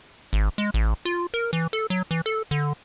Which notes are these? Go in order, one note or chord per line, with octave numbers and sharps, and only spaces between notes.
G#1
G#3
A1
F4
A#4
E3
A4
F#3
E3
A4
D3